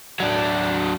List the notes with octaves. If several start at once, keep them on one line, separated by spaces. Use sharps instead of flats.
F#3 D4